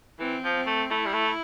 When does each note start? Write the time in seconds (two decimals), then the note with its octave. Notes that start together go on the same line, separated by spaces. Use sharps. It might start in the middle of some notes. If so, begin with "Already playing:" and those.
0.20 E3 C4
0.44 F3
0.55 C4
0.66 A3
0.90 A3 E4
1.06 G3
1.14 A3